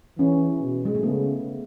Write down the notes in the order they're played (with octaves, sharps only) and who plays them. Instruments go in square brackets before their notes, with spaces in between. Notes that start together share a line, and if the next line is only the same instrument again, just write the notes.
[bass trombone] E3 [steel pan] C#4
[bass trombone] B2
[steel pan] G#3
A3
[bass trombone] C#3 [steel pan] B3